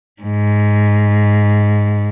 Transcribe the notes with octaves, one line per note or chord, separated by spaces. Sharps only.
G#2